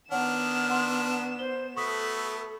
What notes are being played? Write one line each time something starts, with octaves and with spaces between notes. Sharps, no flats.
D#3 B3 D4 C#5 F#5 F6 E7
F#5 C6
C5 G7
A3 B3 F#4 A4 C#6 D#6 B6